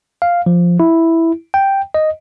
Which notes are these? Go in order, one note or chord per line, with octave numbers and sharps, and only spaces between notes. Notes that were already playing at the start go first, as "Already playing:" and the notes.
F5
F3
E4
G5
D#5